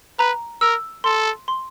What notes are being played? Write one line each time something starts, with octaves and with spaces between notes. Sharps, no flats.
B4 A#5
A#4 E6
A4 C6
C6